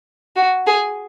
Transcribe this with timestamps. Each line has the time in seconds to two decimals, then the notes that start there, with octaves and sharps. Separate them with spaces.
0.36 F#4
0.66 G#4